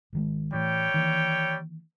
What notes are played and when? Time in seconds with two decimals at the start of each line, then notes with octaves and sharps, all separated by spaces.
0.13 G#1 D#3 G#3
0.53 A2 E3 G3 C#5 G5
0.94 D#3 E3 A#3